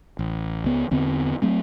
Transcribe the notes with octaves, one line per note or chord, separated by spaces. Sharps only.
A1
C#2 B3
E2 D3 B3 C4
F#3 A3 C4